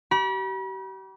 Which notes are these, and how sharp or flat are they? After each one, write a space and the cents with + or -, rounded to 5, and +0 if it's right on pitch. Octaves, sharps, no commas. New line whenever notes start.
G4 -40 B5 -40